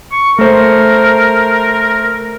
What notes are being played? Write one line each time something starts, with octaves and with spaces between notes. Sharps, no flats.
C#6
A3 A#4 C5